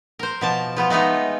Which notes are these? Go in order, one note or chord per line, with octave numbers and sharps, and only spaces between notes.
A#4 C5
B2 F3 A5
F3 B3 F4
G#3 A3 B3 D#4